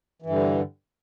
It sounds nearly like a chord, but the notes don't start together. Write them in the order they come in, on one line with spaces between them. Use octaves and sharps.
E3 G2 D3